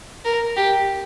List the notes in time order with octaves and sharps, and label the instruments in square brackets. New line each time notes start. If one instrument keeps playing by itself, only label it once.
[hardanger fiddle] A#4
G4